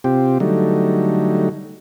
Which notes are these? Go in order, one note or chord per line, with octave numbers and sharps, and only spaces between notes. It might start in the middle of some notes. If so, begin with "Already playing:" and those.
C3 C4 F4 G4
D3 F#3 G3 A3 D#4